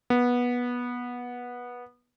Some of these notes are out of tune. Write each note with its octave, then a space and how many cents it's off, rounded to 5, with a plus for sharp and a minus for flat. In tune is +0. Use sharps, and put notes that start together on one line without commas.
B3 -15